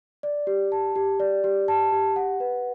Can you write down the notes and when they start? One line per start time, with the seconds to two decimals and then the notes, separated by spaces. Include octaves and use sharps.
0.23 D5
0.47 G4
0.72 A5
0.96 G4
1.20 D5
1.44 G4
1.68 A5
1.92 G4
2.16 F#5
2.40 B4